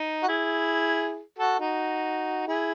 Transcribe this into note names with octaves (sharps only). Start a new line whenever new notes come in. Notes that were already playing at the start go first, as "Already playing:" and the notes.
Already playing: D#4
F#4
E4 G#4
F#4 A4
D#4 F#4
E4 G#4